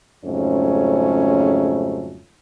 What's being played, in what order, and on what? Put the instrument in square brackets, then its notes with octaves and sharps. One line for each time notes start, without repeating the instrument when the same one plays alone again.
[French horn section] F2 G#2 C#3 F#3 A3 C#4